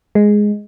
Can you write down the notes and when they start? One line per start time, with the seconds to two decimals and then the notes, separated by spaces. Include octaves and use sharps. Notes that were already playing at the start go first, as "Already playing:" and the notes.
0.15 G#3